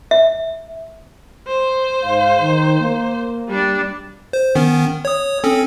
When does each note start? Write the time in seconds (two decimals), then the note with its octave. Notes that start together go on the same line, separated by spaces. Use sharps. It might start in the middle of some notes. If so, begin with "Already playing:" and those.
0.11 E5
1.47 C5
2.03 G#2 F5
2.41 D#3
2.81 A#3
3.48 G3 D4
4.33 C5
4.55 D#3 B3 C#4
5.05 C#5 D#6
5.44 C4 C#4 A4